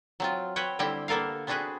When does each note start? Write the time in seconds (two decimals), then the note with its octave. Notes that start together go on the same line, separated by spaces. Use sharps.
0.20 F#3 C4 F4
0.56 C4 B4 C#5 F#5 G5
0.79 D3 G3 C4 E4 G4 G5
1.08 A#3 B3 A4 A#4 F5
1.47 B3 C4 D4 F#4 G#4 B4